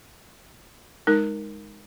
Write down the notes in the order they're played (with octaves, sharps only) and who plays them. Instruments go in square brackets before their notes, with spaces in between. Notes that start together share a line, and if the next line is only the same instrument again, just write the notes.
[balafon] G#3 D#4 A#4